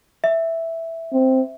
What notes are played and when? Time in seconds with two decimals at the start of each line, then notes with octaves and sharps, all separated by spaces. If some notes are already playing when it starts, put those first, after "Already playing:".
0.24 E5
1.13 C4